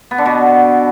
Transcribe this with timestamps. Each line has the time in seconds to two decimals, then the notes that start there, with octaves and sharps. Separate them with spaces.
0.11 B3
0.18 D3
0.26 B2